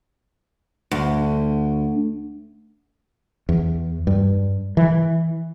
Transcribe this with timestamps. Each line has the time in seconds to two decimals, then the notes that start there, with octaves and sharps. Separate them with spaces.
0.91 D2
3.49 E2
4.07 G2
4.77 E3